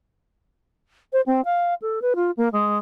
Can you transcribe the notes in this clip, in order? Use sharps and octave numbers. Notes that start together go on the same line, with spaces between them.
C5
C4
F5
A4
B4
F4
A#3
G#3